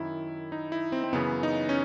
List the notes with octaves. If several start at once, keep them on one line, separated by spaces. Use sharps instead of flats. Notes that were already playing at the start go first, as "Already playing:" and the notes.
Already playing: F#2 D#3 E4
D#4
E4
C4
C4
F#2 C#3 E3 B3
D#4
C#4